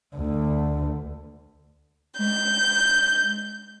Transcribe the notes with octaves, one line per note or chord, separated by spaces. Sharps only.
D2
G#3 G6